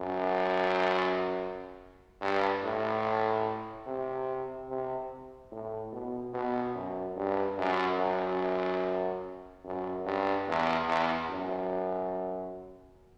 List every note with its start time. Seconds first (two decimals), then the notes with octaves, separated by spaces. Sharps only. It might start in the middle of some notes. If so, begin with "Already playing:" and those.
Already playing: F#2
2.22 G2
2.63 A2
3.87 C3
4.69 C3
5.52 A2
5.93 B2
6.34 B2
6.76 F#2
7.17 G2
7.58 F#2
7.99 F#2
9.65 F#2
10.06 G2
10.47 E2
10.88 E2
11.30 F#2